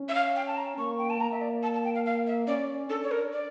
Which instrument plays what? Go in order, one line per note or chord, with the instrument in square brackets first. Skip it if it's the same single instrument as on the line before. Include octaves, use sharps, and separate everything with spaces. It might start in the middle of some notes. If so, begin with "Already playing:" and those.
Already playing: [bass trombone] C#4
[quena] E5
F5
G5
A5
A#5
[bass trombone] A#3 [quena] C#6
[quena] G5
A5
[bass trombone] A#3 [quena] A#5
[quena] E5
D5
A5
A5
G5
F5
F5
E5
[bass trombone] C#4 [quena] D5
[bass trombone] D4 [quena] A4
[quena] C#5
A#4
D5